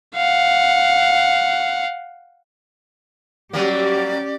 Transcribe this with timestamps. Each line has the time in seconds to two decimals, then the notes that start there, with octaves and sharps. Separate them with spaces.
0.16 F5 F#5
3.53 F#3 G3 A#3 C#4 G4 D5